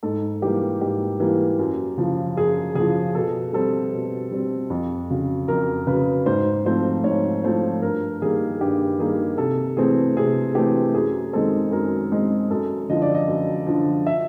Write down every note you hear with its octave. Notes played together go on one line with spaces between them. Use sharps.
G#2 A4
E3 G3 A#3 G4
G#2 G4
E3 G3 A#3
F#2
C#3 F3
F#2 G#4
C#3 F3 G#4
B2 A4
G3 C4 A4
B2
G3 C4
F2
C#3 F#3
F2 A#4
C#3 F#3 B4
G#2 C5
F3 A3 C4 C5
G#2 C#5
F3 A3 C4 C5
G2 A#4
D#3 G3 A#3 G#4
G2 G4
D#3 G3 A#3 G#4
C3 A4
E3 A3 C4 G#4
C3 G#4
E3 A3 C4 G4
F#2 G#4
D#3 G#3 C4 A4
F#2 A#4
D#3 G#3 C4
F#2 A4
D3 F3 D#5
D5
D#5
F#2
D3 F3
E5